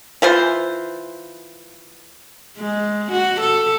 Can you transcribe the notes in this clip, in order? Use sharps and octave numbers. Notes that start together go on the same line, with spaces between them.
E3 F4 C5
G#3
F#4
A4